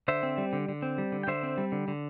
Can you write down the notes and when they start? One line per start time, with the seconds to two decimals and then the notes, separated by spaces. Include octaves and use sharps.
0.08 D3 C5 E5
0.23 C4
0.38 G3
0.53 D3
0.69 D3
0.82 C4
0.98 G3
1.12 D3
1.23 G5
1.27 D3 C5 E5
1.43 C4
1.58 G3
1.72 D3
1.88 D3